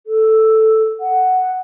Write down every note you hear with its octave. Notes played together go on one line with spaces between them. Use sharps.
A4
F#5